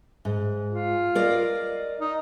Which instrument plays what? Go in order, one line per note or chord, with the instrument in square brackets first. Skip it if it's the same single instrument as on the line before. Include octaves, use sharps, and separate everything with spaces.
[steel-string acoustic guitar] G#2
[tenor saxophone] F4
[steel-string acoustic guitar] A#4 D5 D#5
[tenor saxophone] D#4